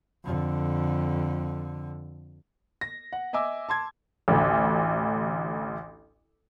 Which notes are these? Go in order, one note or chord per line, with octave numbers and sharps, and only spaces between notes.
F2 D3
A#6
F#5
D#5 E5 G#5 D6 E6
A5 C6 G#6
A1 D2